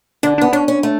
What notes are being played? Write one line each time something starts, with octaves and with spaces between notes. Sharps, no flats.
D3 D4
B3 D4
C#4 D4
C#4
A3